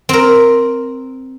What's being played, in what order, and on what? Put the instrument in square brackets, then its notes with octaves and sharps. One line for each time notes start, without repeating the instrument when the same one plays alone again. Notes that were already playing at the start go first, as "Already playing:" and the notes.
[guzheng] C4 A#4